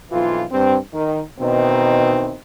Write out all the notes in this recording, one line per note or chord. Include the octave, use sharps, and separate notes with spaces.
B1 F2 E3 F4
G2 C4
D#3
B2 D#3 E3 C4 D#4